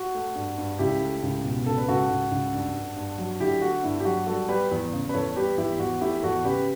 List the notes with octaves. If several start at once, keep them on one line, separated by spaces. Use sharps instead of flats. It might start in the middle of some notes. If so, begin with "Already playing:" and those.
Already playing: F#4
A3
G2
G2
C#2 E4 G4
A3
C#2
B2
C#2 A4
B4
C#2 F#4 A4
C#2
C#2
G2
G2
G2
F#3
D3 E4 G4
A3 F#4
G2 E4
G4
F#3 F#4
G3 F#4 A4
G3 G4 B4
E2
C#3
B4
E2 A4 C#5
G3 G4 B4
E2 E4 G4
E2 F#4
A3 E4 G4
E2 F#4 A4
C#3 G4 B4